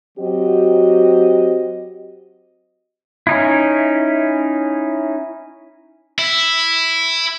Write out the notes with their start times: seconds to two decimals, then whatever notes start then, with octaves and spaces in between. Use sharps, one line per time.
0.18 F#3 C4 F#4 G4 D#5
3.27 C#4 D#4 E4
6.18 E4